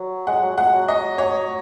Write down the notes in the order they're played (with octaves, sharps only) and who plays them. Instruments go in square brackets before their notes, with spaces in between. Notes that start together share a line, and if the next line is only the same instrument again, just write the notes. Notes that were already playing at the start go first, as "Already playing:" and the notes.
Already playing: [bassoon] F#3
[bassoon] G#3 [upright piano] F#5
[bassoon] F#3
[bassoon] G#3 [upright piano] F#5
[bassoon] F#3
[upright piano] D#5
C#5